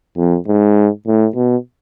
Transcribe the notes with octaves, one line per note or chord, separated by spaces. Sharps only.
F2
G#2
A2
B2